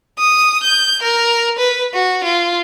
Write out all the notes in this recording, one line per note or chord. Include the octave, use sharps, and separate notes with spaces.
D#6
G6
A#4
B4
F#4
F4